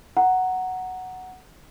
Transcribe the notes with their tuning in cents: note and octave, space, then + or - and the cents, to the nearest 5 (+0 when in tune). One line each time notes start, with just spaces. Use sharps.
F#5 +0 A#5 +0